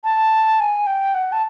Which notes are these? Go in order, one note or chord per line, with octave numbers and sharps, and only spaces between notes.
A5
G#5
G5
F#5
A5